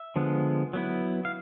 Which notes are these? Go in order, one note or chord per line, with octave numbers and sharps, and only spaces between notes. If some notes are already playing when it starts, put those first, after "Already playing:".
Already playing: E5
D3 F3 G#3 B3
F#3 B3 E4
F5